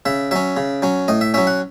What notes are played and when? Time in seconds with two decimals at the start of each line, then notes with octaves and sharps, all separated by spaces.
0.06 C#3 E5
0.31 F#3 C#4 E5
0.57 C#3
0.82 F#3 C#4
1.08 A2 D#5
1.21 E5
1.34 F#3 C#4 E5
1.47 F#5